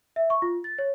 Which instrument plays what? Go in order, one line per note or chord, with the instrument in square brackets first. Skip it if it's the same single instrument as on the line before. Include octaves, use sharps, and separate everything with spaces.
[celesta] E5
C#6
F4
A6
C#5